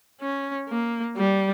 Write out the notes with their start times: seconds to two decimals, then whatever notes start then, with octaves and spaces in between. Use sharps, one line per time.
0.21 C#4
0.69 A#3
1.17 G3